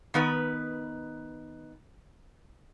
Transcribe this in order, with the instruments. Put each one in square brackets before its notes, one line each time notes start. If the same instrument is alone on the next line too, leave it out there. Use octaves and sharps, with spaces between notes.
[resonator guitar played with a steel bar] D#3 B3 B4